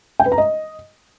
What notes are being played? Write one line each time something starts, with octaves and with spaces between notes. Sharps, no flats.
G5
B4
A#5
D#5